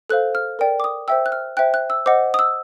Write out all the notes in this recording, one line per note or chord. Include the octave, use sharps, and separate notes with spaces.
A4 C5 F5 F#6
F6
A#4 D5 G5
D6
D#6
C5 E5 G5 E6
F#6
F6
C5 E5 G5 F#6
F#6
E6
C5 D#5 F#5 D6
D#6
E6